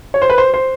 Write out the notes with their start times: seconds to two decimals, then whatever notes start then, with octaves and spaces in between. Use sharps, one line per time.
0.14 C#5
0.22 C5
0.30 B4
0.38 C5
0.54 C5